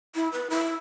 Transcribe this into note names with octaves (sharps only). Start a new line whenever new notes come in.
E4
B4
E4